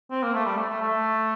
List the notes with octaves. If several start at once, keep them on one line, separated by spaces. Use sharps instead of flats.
C4
A#3
A3
G3
A3
A3
A3